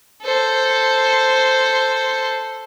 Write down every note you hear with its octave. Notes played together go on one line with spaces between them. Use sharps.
A4 C5